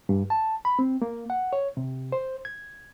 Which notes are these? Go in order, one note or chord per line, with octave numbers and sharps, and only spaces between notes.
G2
A5
B5
C4
A#3
F#5
C#5
C3
C5
G#6